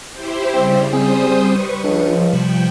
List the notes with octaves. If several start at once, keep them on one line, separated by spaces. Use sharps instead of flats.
E4 G4 C5
C#3 G3 C4
G3 C4 G#4 C5 D#6
B4 C#6
C#2 F3 D4
C3 F3 G3 G5